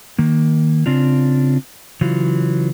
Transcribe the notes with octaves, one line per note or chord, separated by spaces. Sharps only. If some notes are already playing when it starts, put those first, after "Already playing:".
D#3 A#3
C#3 C4 D4 F4
C#3 E3 F#3 F4